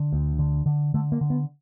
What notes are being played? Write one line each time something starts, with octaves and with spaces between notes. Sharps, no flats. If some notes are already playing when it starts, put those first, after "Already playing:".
Already playing: D3
D2
D3
D3
D3 A3
A#3
D3
B3